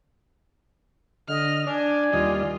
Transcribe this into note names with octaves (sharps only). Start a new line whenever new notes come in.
D3 D#5 F6
D4 D5 G#5
D#2 G3 F4 D#5